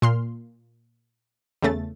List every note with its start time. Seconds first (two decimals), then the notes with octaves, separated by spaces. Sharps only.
0.02 A#2 C6 F6
1.62 E2 C#3 A3 A6